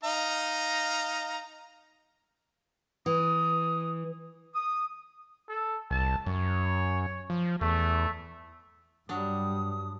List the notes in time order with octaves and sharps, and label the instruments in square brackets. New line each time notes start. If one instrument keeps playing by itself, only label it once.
[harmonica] D#4 F5 A#5
[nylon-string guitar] E3 [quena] D#6
[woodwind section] D#6
[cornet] A4
[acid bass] C2 [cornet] A5
[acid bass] F#2 [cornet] C#5
[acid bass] F3
[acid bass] E2 [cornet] A3
[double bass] G2 [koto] F#3 D4 [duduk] G3 [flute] D#6